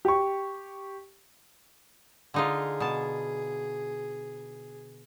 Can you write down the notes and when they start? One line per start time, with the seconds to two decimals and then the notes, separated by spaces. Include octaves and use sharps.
0.05 G4 C#6
2.34 D3 D#4 F4 G#4
2.80 B2 A5